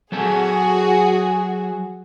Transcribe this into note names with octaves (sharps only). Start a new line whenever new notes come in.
F#3 F#4 G#4 A4 A5